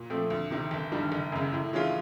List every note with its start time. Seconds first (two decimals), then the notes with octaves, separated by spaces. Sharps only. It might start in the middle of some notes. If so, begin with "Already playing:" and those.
Already playing: A#2
0.10 F3 A3 C4
0.30 D2
0.51 C3 D#3
0.71 G1
0.92 G2 D#3 G3
1.12 F#1
1.32 F#2 C#3
1.53 A2
1.73 E3 G#3 C#4 F4